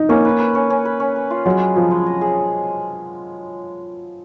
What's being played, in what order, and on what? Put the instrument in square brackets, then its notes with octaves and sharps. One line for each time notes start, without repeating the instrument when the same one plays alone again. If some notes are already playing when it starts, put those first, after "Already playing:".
Already playing: [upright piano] D#4
[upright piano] A#3 [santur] C#4
[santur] B4
B4
C#4
C#4
B4
C#4
B4
F4
[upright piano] F#3 [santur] G#3
[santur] G#4
[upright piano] F3 [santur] G#4
[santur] G#3
D#5
G#4